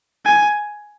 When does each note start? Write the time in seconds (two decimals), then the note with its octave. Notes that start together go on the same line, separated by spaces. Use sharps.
0.25 G#5